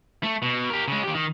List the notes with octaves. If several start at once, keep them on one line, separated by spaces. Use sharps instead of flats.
A3
B2
G4 A#4
C#3 G#3
D#3 G4
D#3